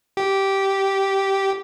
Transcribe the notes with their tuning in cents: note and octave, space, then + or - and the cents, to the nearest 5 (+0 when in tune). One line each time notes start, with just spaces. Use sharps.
G4 -10